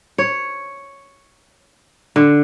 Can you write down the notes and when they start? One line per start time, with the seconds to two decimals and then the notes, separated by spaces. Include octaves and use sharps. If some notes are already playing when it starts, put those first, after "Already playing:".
0.18 C#5
2.16 D3